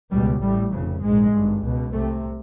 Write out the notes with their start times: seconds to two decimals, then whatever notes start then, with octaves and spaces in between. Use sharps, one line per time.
0.11 C#2 B2 G3
0.41 A1 A2 G3
0.72 F1 F2 C#3
1.02 A#1 G#2 G#3
1.32 G#1 G2
1.62 C#2 B2
1.92 C2 C3 A3